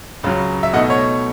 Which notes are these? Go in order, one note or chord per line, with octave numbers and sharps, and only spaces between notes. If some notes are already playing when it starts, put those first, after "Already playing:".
C#2 C#3 F#3
E5
B2 A3 D#4 D#5 F#5
C#5